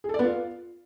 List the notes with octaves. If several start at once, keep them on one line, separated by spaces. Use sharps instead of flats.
G#4
A4
D5
B3
F4